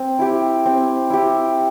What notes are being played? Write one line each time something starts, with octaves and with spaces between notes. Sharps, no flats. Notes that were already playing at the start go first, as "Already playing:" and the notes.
Already playing: C4
E4 G4
C4
E4 G4